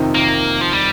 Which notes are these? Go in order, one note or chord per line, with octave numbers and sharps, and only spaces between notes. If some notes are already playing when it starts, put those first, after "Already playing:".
Already playing: F2 C3 D#3 C4 D#4
A#3
F3
G3